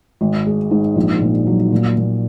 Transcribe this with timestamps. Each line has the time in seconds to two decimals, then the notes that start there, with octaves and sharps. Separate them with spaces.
0.21 G#1
0.46 G#3
0.71 G#2
0.96 A#1
1.21 A#2
1.47 F#3
1.72 A#2
1.97 A#2